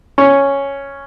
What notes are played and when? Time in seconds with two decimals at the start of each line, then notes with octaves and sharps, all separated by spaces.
0.18 C#4